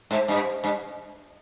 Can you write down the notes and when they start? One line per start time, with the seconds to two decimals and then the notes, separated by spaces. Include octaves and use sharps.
0.11 G#2
0.28 G2
0.64 G2